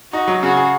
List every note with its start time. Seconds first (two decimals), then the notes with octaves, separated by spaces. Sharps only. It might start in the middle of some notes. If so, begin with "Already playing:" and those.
0.13 D#4 F#4
0.28 F#3
0.42 C#3 F#4
0.57 G#4